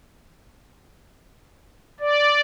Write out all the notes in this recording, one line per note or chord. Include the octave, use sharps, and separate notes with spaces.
D5